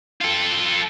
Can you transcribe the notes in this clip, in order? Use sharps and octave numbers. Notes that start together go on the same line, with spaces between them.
F4 A4